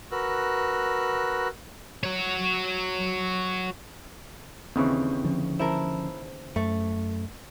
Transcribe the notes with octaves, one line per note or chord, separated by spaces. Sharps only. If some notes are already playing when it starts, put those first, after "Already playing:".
F#4 A#4 B4 E6 F#6
F#4 C#5
D#2 C#3 E3 C4
D3 F3 C#4
E4 A#4 C5 A5
F#2 A3